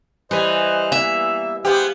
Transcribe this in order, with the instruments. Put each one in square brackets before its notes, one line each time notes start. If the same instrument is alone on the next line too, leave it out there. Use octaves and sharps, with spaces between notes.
[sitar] E3 [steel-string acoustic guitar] G3 B4 G#5 [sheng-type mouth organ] C5 D#5
[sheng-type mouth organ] A#3 B3 [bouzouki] E5
[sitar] B3 G4 [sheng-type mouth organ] G#4 C5 F5